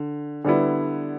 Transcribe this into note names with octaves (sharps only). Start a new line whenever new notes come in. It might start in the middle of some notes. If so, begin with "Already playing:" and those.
Already playing: D3
D3 G3 B3 E4